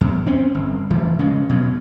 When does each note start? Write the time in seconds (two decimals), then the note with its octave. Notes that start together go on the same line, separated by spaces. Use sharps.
0.01 E2
0.26 C4 C#4
0.54 G1
0.90 F1 E3 F3
1.19 C#3 G#3 C#4
1.49 B2 F#3